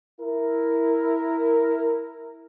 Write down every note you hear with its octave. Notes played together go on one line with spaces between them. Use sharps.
E4 A#4